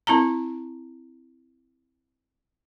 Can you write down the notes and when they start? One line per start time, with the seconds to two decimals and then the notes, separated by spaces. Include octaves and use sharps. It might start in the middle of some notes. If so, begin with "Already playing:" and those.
0.07 C4 E4 A5 A#5